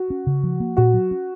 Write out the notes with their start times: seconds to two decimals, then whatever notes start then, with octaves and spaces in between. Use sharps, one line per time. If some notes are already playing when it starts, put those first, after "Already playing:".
Already playing: F#4
0.10 C#4
0.27 C#3
0.43 F3
0.60 A#3
0.77 A#2 F#4
0.94 F#3
1.11 C#4